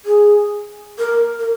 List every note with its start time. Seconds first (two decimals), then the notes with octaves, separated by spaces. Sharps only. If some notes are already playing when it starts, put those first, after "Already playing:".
0.05 G#4
0.98 A#4
1.39 A#4